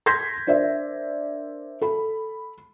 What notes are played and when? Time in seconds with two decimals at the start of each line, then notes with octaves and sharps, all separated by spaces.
0.06 C6 G6 G#6 A#6 B6
0.47 D4 A#4 C5 D5 E5
1.82 A4 B5